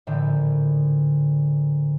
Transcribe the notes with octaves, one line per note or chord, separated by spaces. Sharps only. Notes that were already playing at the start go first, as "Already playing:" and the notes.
A#1 A2 D3